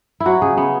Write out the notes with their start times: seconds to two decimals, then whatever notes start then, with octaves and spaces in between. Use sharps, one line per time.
0.20 E4
0.26 F#3 F#4
0.42 C#3 G#4
0.57 C#3 B3